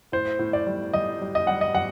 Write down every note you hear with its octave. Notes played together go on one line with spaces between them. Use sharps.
A2 C5
A2
D5
G3
G3 D#5
G3
D#5
G3 F#5
D#5
G3 F#5